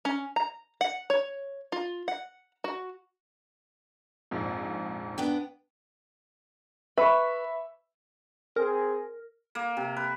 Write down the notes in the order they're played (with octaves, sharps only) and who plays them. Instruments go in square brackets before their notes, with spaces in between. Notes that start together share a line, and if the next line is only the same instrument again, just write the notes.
[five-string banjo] C#4
A#5
F#5
C#5
F4
F#5
F#4
[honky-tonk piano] A#1 F2 G#2
[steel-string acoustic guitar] B3 D4 G5
[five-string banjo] B4 [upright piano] E5 B5 C#6
[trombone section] C4 G#4 [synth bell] A#4
[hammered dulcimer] A#3
C3
B4